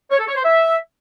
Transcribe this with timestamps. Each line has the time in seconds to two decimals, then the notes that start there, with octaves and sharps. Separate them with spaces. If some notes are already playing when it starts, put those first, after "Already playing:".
0.11 C#5
0.20 A4
0.28 C#5
0.36 C5
0.45 E5